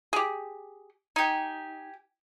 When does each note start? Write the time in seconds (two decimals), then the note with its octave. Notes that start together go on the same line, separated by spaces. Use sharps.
0.13 G4 G#4
1.16 D#4 G4 G#5